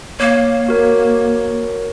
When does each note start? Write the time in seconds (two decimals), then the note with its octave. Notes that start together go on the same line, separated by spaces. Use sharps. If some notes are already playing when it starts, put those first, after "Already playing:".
0.20 A#3 C#5 F5
0.68 F#4 A#4 C#5